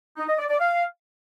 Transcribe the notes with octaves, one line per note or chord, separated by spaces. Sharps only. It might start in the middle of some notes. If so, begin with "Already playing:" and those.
D#4
D#5
D5
D5
F5